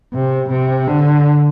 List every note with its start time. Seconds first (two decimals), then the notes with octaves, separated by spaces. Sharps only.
0.14 C3
0.50 C3
0.88 D3